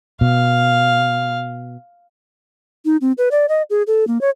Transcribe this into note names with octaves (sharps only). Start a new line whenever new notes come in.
B2 F5
D#4
C4
B4
D5
D#5
G#4
A4
A#3
C#5